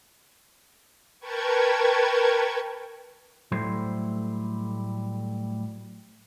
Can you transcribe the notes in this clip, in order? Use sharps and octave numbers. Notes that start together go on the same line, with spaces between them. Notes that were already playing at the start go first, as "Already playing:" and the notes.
A#4 B4 G5 A5 C#6 G#6
A2 F#3 G3 A3 E4 C5